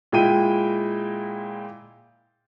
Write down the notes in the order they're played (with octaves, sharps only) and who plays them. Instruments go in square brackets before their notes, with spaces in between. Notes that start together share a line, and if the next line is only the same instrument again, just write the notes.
[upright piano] A#2 G#3 E4 G5 D#7